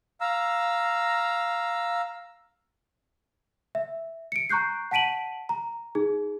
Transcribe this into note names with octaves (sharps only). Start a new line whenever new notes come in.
F5 A#5 E6
E5
C#7 D7
A#5 C#6 F#6 G6 C7
F#5 A5 B6 D7 D#7 F#7
A#5
D#4 G#4